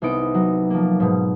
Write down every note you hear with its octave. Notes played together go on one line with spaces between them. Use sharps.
C2 B3 D#4 D7
F#3
F3 A#3
G#2 B2